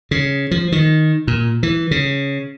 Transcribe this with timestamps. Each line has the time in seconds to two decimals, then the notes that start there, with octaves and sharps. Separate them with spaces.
0.11 C#3
0.51 F3
0.72 D#3
1.27 A#2
1.63 E3
1.91 C#3